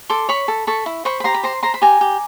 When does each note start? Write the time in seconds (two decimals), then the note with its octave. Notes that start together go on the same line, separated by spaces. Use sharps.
0.10 A4 C6 D6
0.29 C#5 B5 C#6
0.48 A4
0.67 A4 B5 C#6
0.86 E4
1.05 C5 B5 C#6
1.20 B5
1.24 G4 A#5 C6
1.34 B5
1.43 C5 A#5 C6
1.63 C5 A#5 C6
1.74 B5
1.82 G4 G#5 A#5
2.01 G4